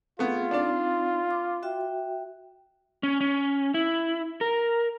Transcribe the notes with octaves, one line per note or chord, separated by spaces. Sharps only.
A3 B3 C4 F4 G#4
C4 D4 D#4 D5
D6
F#4 E5 G5
C#4
C#4
E4
A#4